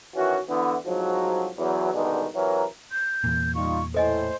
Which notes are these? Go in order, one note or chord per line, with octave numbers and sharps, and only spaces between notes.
D#3 E3 C#4 F#4
D3 E3 B3
C2 G#2 F3 F#3
E2 F#3
G2 B2 D3 D#3 G#3 D#4
C3 E3 F#3 A#4
G6
E2 A#2
G3 D#4 F4 C#6
A2 A4 C5 D#5 G#5